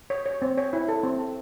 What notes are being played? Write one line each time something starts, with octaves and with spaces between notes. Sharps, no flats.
C#5
C#5
C4
C#5
E4
A4
C4
A4